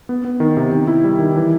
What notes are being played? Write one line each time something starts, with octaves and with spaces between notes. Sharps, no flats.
B3
B3
D#3
C3
D#3
E4
G3
D#3
E3